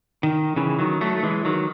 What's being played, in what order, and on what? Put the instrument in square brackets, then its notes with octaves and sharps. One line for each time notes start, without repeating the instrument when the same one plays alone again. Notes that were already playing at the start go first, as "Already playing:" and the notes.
[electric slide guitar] D#3
C#3 E3
D#3 F#3
F#3 A3
A3
E3 G#3
D#3 F#3